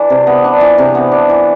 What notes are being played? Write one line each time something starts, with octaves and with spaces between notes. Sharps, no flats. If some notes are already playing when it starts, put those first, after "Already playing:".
Already playing: E3 D4
C3
B3
D4
E3
C3
B3
D4
E3